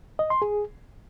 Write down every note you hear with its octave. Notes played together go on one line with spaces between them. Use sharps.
D#5
C6
G#4